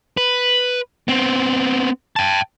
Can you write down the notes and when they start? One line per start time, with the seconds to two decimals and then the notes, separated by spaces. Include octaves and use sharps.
0.17 B4
1.08 B3 C4
2.16 G5 A5